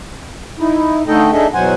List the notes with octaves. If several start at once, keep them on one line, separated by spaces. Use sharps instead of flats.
D#4 E4
D3 A3 D#4 A4 D#5 G5
D4 D#4 G#4 A4 D#5 E5
E2 B2 F#3 C5 F#5 G#5